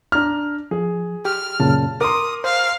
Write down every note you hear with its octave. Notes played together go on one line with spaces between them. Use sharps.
D4 A#5 F6
F3 G#4
G4 F6
F#2 A#2 C#3 A5
A#4 C6 D6 D#6
C5 F5